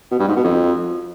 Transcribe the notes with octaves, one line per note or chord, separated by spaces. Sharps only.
B2
G2
G#2
B2
F2